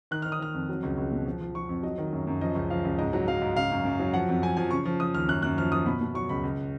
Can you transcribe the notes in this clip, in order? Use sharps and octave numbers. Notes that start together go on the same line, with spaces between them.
D#3 F#6
D#3 F6
D#6
D#3 F6
F2
F#3
C#2
C#2
B2
F3
F3
F3 C#6
F2
F#3 D#5
D#3
F#2
F#2
F3 D#5
C#2
F3 F5
C#2
G#2 D#5
F#3
F#3 F5
G#2
C#3 F5
F#2
F#2
F#3
F3 F#5
F2
F2 G#5
F3 G#5
C#3 C#6
F3
F3 D#6
D#2 F6
F#2 F#6
F#2 F#6
F3 F6
F3 D#6
B2 B5
B2
F#3 C#6
C#2 B5
C#2